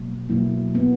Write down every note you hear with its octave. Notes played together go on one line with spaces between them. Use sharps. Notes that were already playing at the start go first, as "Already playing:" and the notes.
Already playing: B2 F#3 A#3
B2 F#3 A#3 E4
B3